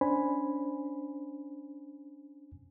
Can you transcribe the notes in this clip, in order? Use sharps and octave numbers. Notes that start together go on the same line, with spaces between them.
C#4 D4 C5 G#5 B5